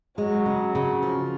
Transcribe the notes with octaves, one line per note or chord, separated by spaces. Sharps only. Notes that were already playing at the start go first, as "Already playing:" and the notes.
F#3 G#3
C#3
C#3
F3